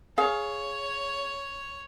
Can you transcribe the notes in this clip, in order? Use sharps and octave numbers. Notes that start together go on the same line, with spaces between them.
G#4 C#5 F5